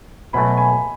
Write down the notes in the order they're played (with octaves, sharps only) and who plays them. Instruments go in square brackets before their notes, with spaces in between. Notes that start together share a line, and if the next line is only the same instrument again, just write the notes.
[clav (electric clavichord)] B2 F#3 A3 [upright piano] G#5 B5
[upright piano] G#5 B5